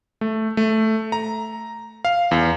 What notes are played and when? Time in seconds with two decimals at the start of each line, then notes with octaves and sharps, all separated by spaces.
0.21 A3
0.57 A3
1.12 A#5
2.05 F5
2.31 E2